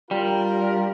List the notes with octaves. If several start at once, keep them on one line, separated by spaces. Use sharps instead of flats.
G3 D4 F4 A#4